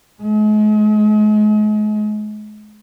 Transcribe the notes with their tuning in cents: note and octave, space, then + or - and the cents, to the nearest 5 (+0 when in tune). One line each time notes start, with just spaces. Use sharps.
G#3 +40